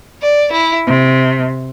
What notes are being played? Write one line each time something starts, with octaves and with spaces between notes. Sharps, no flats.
D5
E4
C3